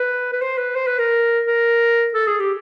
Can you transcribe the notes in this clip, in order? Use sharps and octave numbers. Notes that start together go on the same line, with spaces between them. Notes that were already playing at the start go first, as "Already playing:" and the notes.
Already playing: B4
B4
C5
B4
C5
B4
A#4
A#4
A4
G#4
G4